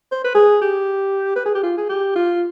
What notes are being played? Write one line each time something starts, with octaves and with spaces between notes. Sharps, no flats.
C5
B4
G#4
G4
B4
G#4
G4
F4
G#4
G4
F4